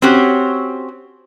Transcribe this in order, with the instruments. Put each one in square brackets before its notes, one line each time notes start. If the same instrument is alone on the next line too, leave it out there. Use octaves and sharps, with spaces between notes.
[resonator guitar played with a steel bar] C4 C#4 F#4 G4 C#5